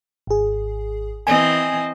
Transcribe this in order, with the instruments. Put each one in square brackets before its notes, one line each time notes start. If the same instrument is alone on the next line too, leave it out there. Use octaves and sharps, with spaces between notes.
[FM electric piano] G#1 G#4
[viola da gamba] E3 C4 D#5 [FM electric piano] G#5